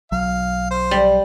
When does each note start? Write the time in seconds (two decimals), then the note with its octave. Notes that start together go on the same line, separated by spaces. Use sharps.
0.12 B1 F#3 F5
0.71 C5
0.91 G3